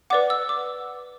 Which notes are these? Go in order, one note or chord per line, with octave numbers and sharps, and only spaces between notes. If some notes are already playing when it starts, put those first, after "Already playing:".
B4 D5 F#5 D6
E6
D6